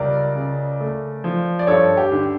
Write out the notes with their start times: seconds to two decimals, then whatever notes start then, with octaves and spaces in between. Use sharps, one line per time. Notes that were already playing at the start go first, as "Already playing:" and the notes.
Already playing: C#2 G3 A#4 D5
0.35 C#3
0.80 A3
1.24 F3
1.59 D5
1.67 G2 A4 C#5
1.97 G4
2.12 D3